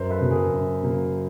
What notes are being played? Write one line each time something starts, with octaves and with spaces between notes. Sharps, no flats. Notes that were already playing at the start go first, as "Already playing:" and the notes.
Already playing: F#2 A#4 C5
A4 B4
C#3 F#3 A#3
G#4 A#4
F#2
C#3 F#3 A#3